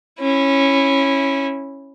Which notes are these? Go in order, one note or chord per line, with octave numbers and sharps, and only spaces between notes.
C#4 E4